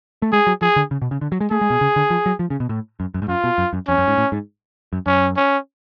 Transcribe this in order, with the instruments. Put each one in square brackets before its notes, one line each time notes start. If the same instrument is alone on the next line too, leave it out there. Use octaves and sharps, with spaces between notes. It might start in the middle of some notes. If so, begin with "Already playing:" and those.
[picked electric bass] A3
[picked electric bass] G#3 [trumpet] G#4
[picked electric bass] F#3
[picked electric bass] F3 [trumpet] G#4
[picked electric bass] D3
C#3
B2
C#3
D3
F#3
G#3
[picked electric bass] A3 [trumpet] G#4
[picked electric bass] G#3
B2
C#3
D3
F3
F#3
F3
C#3
B2
A2
F#2
F#2
G#2
[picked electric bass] F#2 [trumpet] F4
[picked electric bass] B2
F#2
F#2
[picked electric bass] F2 [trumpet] C#4
[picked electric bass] F#2
G#2
A2
G#2
F#2
[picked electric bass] F#2 [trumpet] C#4
[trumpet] C#4